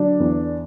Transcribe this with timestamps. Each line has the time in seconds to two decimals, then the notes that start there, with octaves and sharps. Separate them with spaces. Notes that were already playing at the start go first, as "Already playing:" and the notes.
Already playing: D3 F#3 D4
0.20 E2